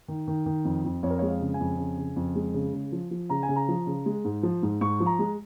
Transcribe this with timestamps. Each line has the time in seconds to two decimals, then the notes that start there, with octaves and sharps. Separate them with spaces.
0.08 D#3
0.28 D#3
0.46 D#3
0.65 F2
0.85 F2
1.03 F2 C#5
1.10 A#4
1.19 G#3 C#5
1.28 F5
1.41 C#3
1.54 G#5
1.60 F2
1.78 C#3
1.98 C#3
2.16 F2
2.35 G#3
2.54 C#3
2.73 C#3
2.92 F3
3.11 F3
3.30 C#3 A#5
3.43 G#5
3.49 C#3
3.56 A#5
3.68 F3
3.87 C#3
4.06 G#3
4.25 G#2
4.43 F3
4.63 G#2
4.81 G#2 C#6
5.00 F3
5.06 A#5
5.19 G#3